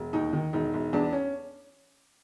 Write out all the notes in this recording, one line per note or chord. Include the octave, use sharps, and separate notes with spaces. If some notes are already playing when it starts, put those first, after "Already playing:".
Already playing: E1
D#2 D#4
D#3
E1 D#4
E1
E2 D4
C#4